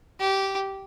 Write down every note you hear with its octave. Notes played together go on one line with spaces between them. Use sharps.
G4